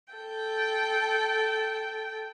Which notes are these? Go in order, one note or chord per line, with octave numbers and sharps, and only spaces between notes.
A4 G5